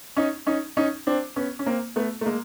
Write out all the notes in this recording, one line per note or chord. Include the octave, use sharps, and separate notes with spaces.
C#4 D#4
C#4 D#4
C#4 D#4
C4 D4
B3 C#4
C#4
A#3 C4
A3 B3
A3
G#3 A#3